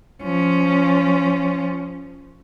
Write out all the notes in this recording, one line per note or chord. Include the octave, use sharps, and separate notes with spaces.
F3 C#4